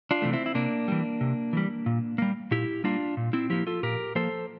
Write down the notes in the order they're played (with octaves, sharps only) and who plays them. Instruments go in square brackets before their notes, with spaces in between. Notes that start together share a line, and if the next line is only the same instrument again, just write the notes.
[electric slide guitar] D4 F4
C3 E3 A3
C4 E4
E4
C3 A#3 D4
E3 G3
C3
E3 G3
A#2
G3 A#3
A#2 E4 G4
G3 A#3 D4 F4
A#2
C4 E4
F3 A#3 E4 G4
F4 A4
A#2 G4 A#4
F3 A#3 A4 C5